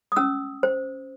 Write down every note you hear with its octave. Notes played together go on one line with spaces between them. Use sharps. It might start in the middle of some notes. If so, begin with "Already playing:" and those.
D#6
C#4 E6
C5